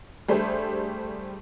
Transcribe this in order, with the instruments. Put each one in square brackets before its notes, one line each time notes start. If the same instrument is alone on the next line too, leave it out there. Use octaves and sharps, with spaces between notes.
[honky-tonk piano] G3 A3 D4 G#4 C5